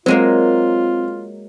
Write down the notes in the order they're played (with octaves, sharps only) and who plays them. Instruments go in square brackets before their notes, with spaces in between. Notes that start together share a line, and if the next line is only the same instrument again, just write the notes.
[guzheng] F#3 G#3 A#3 [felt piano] C4 [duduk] F4